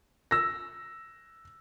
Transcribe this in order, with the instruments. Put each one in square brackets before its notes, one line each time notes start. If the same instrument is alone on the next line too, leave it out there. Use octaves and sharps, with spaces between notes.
[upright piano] E6 A#6